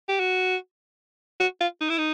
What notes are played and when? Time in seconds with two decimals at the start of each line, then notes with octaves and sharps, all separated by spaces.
0.09 G4
0.20 F#4
1.40 F#4
1.61 F4
1.81 D#4
1.90 E4
1.98 D#4